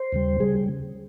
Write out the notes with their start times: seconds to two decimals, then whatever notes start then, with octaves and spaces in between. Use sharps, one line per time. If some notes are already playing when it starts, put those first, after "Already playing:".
Already playing: C5
0.12 D#2 C#3 G3
0.40 C#3 G3 G#4